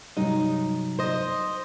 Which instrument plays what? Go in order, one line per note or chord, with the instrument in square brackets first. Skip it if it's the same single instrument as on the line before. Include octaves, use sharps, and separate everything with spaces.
[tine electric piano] G2 C3 F#3 [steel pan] G3 [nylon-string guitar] D#4
[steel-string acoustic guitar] C5 D#5